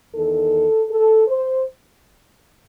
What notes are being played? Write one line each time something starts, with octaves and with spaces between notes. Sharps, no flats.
E2 D#3 A4
A4
C5